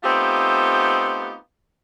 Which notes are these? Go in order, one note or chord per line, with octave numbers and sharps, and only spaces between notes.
A3 B3 C4 D#4 F4 G4